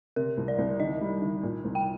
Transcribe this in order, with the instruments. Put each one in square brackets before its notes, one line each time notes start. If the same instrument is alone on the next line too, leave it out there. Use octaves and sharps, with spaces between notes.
[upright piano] C3 [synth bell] A#4
[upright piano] C2
[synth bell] D5
[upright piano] C2
[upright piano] D#3 [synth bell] D#5
[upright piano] G3
D#3
A#2
C2
[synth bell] G5